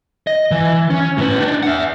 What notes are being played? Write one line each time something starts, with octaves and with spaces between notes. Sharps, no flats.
D#5
E3
C#4
A2 B4
D4 D#4
E5 F#5